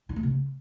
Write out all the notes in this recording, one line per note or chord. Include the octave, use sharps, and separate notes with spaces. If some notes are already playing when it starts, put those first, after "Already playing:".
D#4
A3
C3
C#3